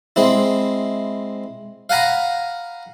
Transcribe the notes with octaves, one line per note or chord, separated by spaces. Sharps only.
G#3 C4 E4
F5 F#5 G#5 A#5 B5